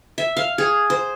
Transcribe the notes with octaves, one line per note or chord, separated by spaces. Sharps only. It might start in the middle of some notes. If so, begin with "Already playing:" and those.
E5
F5
G#4
C5